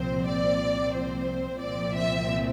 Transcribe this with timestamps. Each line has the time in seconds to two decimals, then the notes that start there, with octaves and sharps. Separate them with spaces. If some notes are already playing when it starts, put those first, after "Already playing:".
Already playing: C2 A#2 F3 C4 C5
0.26 D5
0.94 C5
1.61 C2 A#2 F3 C4 D5
1.95 E5